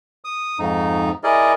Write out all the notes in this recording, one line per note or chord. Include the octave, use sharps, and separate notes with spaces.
D#6
F2 G#2 D#4
E4 G#4 A#4 D5 D#5